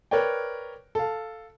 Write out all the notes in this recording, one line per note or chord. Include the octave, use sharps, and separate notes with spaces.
A#4 B4 C#5 D5 G5
A4 F5